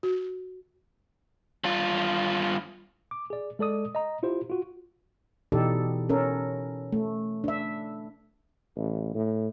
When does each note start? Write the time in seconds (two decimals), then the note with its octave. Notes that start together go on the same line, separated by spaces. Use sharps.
0.03 F#4
1.64 G2 F4
3.11 D6
3.30 G#4 D5
3.59 G#3 A4 D5 D#6
3.95 D#5 A#5
4.23 E4 F4 G4 C5
4.50 F4 F#4
5.52 B2 E3 D#4 G4 A4 D5
6.09 C#4 A4 A#4
6.93 A3
7.44 D4 E5
8.76 A1
9.14 A2